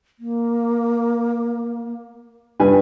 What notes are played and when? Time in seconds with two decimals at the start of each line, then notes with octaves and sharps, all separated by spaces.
0.19 A#3
2.60 G2 B4 G#5